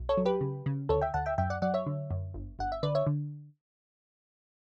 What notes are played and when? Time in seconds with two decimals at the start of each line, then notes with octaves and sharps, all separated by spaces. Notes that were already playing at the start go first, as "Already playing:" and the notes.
Already playing: B1
0.09 A4 C#5
0.17 F#3
0.25 G4 B4
0.41 C#3
0.66 C#3
0.89 D2 A4 C#5
1.01 E5 G5
1.14 D2 F#5 A5
1.26 E5 G5
1.38 F#2 E5 G5
1.50 D5 F#5
1.62 F#3 D5 F#5
1.74 C#5 E5
1.87 D3
2.11 F#2
2.34 G1
2.59 G1 F#5
2.72 E5
2.83 D3 B4 D5
2.95 C#5 E5
3.07 D3